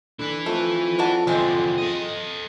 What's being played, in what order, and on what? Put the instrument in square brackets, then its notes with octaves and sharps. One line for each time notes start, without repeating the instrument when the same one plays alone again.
[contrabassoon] D3 [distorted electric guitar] E4 B4
[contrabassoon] F2 [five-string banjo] A3
[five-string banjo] D4 F#4 A5
[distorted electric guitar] E2 D3 [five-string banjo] G#3 C4
[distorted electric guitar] A4 D#5